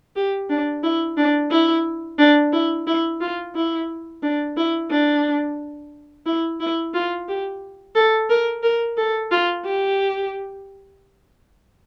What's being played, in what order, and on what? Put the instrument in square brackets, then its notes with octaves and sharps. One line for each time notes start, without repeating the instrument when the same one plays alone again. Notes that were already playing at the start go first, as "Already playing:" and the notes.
[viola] G4
D4
E4
D4
E4
D4
E4
E4
F4
E4
D4
E4
D4
E4
E4
F4
G4
A4
A#4
A#4
A4
F4
G4